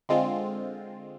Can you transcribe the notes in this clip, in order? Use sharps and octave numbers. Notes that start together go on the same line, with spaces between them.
D3 G#3 C4 F4